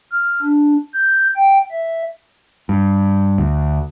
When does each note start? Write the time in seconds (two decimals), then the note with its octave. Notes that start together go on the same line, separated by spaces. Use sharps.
0.11 F6
0.42 D4
0.94 G6
1.36 G5
1.71 E5
2.69 G2
3.38 D2